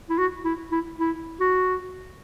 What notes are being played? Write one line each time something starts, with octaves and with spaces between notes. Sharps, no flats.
E4
F#4
E4
E4
E4
F#4